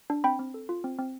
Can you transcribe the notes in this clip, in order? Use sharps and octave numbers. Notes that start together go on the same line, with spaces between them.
D4
C4 G5 B5
C4
A4
F4
C4
C4